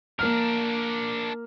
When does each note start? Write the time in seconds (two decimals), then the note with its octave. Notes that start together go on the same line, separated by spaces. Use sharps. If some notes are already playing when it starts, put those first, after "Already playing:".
0.19 A#3 D4 A#4 F6